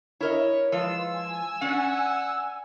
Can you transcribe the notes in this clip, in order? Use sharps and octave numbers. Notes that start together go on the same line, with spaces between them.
E4 A#4 C#5 D#5
F3 G#3 F4 B4 E6
G#5
C#4 D5 F#5